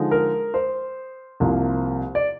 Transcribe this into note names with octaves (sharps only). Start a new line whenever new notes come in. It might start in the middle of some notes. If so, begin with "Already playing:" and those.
Already playing: D3 F3 G#3 D#4
A#4
C5
C2 C3 F3 A#3
D5